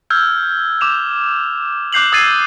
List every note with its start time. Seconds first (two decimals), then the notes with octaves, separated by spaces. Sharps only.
0.10 E6 F6 G6 G#6
0.81 D6 E7 F7
1.93 D6 F#6 G6 C7 F7 F#7
2.12 D#6 E6 G#6 A6 C7 D#7